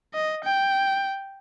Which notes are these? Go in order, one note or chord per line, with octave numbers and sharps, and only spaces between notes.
D#5
G5